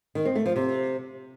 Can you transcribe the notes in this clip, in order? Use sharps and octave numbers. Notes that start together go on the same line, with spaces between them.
D#3
C4
A3
F3
C3